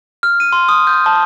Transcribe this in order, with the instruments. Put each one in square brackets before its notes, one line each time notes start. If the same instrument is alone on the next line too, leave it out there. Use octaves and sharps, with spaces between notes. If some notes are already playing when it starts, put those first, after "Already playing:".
[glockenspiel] F6
D#7
C6
D#6
G6
A5